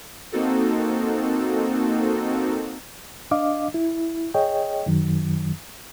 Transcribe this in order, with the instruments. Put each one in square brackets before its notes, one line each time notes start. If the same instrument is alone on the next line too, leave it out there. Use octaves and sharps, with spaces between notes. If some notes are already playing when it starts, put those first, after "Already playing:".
[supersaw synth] A#3 C4 D#4 F#4 A4
[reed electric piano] D4 D#5 F5 D6
E4
G#4 C#5 D#5 G5
F#2 D#3 F#3